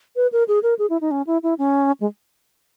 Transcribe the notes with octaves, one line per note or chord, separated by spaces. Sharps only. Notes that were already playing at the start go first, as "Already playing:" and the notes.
B4
A#4
G#4
A#4
G#4
E4
D#4
C#4
E4
E4
C#4
G#3